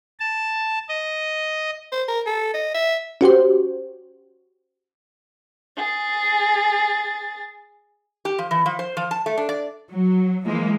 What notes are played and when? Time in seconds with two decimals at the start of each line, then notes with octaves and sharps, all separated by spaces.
0.20 A5
0.89 D#5
1.92 C5
2.08 A#4
2.26 A4
2.54 D#5
2.74 E5
3.21 C#4 F#4 G4 C5
5.77 G#4 A6
8.25 G4
8.39 F3
8.51 E3
8.66 F3
8.79 C5
8.97 F3
9.11 A5
9.26 A3
9.38 D4
9.49 D5
9.91 F#3
10.45 E3 F3 G#3 A#3